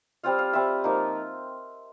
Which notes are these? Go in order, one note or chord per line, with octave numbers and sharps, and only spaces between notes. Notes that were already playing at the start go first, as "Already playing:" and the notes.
G3 C4 F4 F5
F5
G3 C4 F4 E5
F3 A#3 D#4